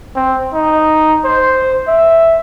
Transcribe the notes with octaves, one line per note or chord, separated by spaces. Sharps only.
C4
D#4
C5
E5